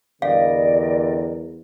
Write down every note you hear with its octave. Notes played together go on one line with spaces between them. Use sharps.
E2 D3 G3 A#4 D5 D#5 F5